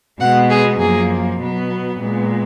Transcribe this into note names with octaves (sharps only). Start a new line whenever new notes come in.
B2 G#3 B3 F#5
G#4
F#2 F3 A#3 G#4
B2 F#3 B3
A#2 G#3 B3